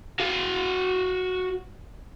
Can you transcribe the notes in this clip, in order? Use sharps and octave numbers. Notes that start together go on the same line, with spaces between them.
F#4 F5